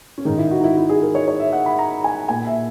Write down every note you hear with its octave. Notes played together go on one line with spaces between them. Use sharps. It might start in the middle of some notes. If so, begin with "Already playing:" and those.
C#4
G#2 D#3 D#4
E4
F#4
D#4
E4
E4
G#4
A#4
C#5
C#5
E5
F#5
B5
A#5
G#5
A#2 G#5
E5